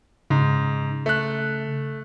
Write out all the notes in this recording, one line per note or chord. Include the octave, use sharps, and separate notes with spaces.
G#2 C#3
A3 F#6